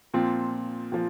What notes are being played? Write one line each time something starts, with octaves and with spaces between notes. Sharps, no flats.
A#2 F3 C4
A#2 F3